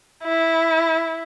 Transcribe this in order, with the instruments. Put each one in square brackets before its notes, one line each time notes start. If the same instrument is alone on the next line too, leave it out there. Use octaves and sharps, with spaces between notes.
[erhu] E4